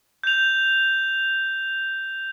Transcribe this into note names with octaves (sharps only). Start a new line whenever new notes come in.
G6 F7